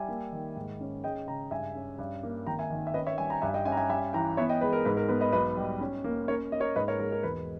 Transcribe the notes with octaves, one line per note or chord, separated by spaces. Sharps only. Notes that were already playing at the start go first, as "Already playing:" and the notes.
Already playing: G3 E5 G#5
A#3
D#3
G#2
C#4
G#3 D#5 G5
C#3 G5 A#5
G2 E5 G#5
C#4
G2
A#3
G#1 G5 A#5
E5 G#5
D#3
E5
C#4 B4 D#5
C#5 E5
G3 E5 G#5
G5 A#5
G2 E5 G#5
D#5 G5
C#4 E5 G#5
A#5
E5 G#5
G3 E5 G#5
E3 G5 A#5
B3 C#5 E5
D#5 G5
G#3 B4
A#4
G#2 B4
A#4
B3 B4
B4 D#5
B1 B4 D#5
G3
C#4
A#3
C#4 A#4 C#5
A#3 D#5
A#4 C#5
G#2 B4 D#5
A#4 C#5
G#3 A#4
A#4
E1 B4